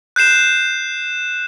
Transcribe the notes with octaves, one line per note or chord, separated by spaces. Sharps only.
F#6 G6 C7 E7